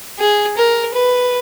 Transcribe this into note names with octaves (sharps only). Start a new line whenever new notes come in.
G#4
A#4
B4